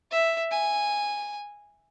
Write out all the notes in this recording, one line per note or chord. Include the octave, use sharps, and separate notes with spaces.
E5
G#5